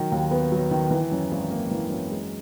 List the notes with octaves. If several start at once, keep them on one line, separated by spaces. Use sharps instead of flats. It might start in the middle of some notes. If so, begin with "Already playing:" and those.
Already playing: D#3 F#3
D#2
B3
F#3
D#3
E3
F#2
G#1
A#3
E3
F#2
G#3